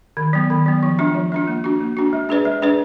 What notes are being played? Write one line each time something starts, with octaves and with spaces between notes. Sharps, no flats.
D#3
F#3 B3
D#3
F#3 B3
F3
G#3 D4 F4
F3
G#3 D4 F4
A#3
D4 F#4
A#3
D4 F#4
G#3
D4 G#4 B4 D5
G#3
D4 G#4 B4 D5